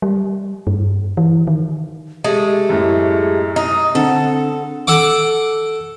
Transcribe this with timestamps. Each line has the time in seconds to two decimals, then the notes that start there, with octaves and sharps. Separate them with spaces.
0.02 G3
0.67 G2
1.17 E3
1.47 D#3
2.24 G#3 A3 G4
2.69 F#2 A2
3.56 D#4 D#6
3.95 D3 C4 A4 F#5
4.87 A4 F#5 D6